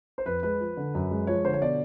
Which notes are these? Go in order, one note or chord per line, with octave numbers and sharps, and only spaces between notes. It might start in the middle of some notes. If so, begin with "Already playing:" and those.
C5
F2 B4
G#3 B4
F3
D3
F#2
G#3
F3 C#5
D3 C5
C#5
B2 D5